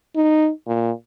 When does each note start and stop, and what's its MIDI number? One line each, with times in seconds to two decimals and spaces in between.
0.16 0.51 63
0.67 0.92 46